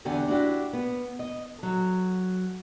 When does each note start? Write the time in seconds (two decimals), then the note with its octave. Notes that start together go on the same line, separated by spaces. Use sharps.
0.05 E2 D3 G4 F#5 G#5
0.28 D4 E4 F#4 G4
0.73 B3
1.19 D#5
1.58 F#3 A4